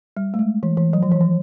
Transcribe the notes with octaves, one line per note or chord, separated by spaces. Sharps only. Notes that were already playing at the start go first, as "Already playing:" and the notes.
G3
A3
G#3
E3
E3
F#3
F3
E3
F3